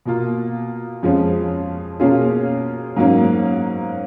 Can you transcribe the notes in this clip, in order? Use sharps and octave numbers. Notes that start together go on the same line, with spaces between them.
B2 A#3 F4
F2 F3 G#3 C#4
B2 A#3 C#4 F4 G#4
G#2 F#3 A#3 C#4